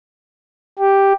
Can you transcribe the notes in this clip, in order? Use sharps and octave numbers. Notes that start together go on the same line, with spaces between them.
G4